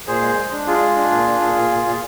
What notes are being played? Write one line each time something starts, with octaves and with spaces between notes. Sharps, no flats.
A#2 G#4 C5
G#3
G#3
D4
G#3 F4 G#4
G#3
D4
A#2
D4
A#2
A#2
A#2
A#2